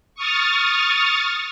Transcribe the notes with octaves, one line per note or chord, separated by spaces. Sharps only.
C#6 D#6 F6 A6